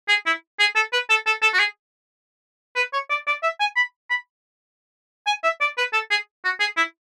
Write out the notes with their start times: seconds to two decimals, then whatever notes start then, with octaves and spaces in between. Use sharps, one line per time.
0.09 G#4
0.26 E4
0.60 G#4
0.76 A4
0.93 B4
1.10 A4
1.26 A4
1.42 A4
1.54 F#4
1.59 G#4
2.76 B4
2.93 C#5
3.10 D5
3.27 D5
3.43 E5
3.60 G#5
3.76 B5
4.10 B5
5.27 G#5
5.44 E5
5.61 D5
5.78 B4
5.93 A4
6.11 G#4
6.45 F#4
6.60 G#4
6.77 E4